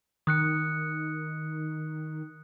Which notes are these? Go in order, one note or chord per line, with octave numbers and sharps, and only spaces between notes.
D#3 D#6 F#6 C#7